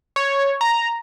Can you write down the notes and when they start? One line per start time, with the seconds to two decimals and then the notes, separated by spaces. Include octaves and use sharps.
0.16 C#5
0.61 A#5